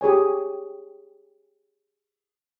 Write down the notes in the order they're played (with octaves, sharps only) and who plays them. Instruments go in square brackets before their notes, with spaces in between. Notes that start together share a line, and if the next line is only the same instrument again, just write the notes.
[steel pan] G4 G#4 C#5 G#5